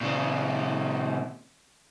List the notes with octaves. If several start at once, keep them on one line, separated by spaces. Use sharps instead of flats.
A#2 C#3